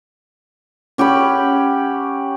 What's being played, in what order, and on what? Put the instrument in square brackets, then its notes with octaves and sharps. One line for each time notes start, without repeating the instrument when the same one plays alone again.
[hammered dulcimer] C#4 G4 F#5 B5